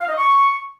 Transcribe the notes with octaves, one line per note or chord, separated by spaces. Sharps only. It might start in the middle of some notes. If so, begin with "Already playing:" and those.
F5
D#5
C#6